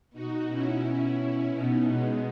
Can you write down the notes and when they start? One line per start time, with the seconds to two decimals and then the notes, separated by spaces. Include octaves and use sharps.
0.13 B2 D#4 F#4
0.48 B2 C#4 E4
0.83 C#4 E4
1.17 C#4 E4
1.53 B2 B3 D#4
1.88 B2 G#3 B3